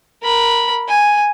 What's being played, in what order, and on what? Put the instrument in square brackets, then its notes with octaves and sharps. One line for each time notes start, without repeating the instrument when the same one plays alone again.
[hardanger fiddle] A#4 B5
G#5